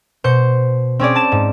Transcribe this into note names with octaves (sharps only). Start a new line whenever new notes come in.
B2 C5 G6 C#7
C4 C#4 G#4 D5
A5 A6 E7
G#2